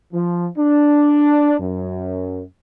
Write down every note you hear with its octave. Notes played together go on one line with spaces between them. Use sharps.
F3
D4
F#2